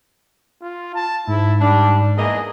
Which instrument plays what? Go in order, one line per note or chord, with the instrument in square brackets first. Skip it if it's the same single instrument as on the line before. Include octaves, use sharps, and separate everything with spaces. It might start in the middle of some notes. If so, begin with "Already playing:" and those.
[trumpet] F4
A5
[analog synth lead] G#2 [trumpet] E4
[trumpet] G3 [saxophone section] D4
[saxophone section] E2 A#3 D#5 [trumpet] G#4